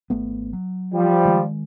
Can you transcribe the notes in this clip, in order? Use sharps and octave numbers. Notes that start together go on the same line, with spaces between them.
G#1 A3 B3
F#3
F3 G3
D#3 G#3